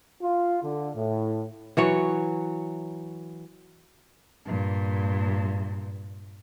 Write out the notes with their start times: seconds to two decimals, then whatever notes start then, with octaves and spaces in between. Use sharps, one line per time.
0.22 F4
0.62 D3
0.96 A2
1.77 E3 F#3 C#5
4.46 G2 A#2